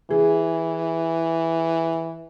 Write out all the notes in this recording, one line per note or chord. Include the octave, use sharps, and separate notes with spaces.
E3 G#4